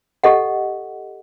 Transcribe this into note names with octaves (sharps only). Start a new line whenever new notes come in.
G4 A4 D#5 F#5